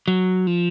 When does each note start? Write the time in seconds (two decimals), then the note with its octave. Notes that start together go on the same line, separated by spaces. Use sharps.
0.08 F#3
0.47 F3